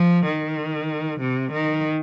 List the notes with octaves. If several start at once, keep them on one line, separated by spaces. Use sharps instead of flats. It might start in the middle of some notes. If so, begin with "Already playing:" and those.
Already playing: F3
D#3
C3
D#3